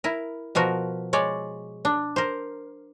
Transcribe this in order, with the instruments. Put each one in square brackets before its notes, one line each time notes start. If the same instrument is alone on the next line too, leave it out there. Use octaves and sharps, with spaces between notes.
[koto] E4 A#4
B2 F3 F#4 A#4
G#3 C#5 D5
D4
A#4 C5